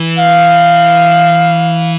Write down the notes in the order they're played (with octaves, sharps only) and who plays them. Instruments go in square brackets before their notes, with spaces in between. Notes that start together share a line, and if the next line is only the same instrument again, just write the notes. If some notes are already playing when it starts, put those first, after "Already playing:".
Already playing: [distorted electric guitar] E3
[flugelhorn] F5